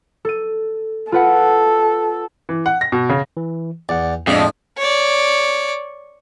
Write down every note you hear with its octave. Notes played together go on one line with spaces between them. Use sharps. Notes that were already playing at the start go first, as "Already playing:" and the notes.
A4 D#7
F4 A4 B4 F#5
E3
F#5
A#6
B2
C#3
E3
E2 D5 F#5
F2 A2 G#3 D4
C#5 D5